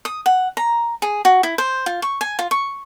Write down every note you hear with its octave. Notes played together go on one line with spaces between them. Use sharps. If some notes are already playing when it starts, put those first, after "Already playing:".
D#6
F#5
A#5
G#4
F#4
E4
C5
F4
C#6
G#5
F4
C#6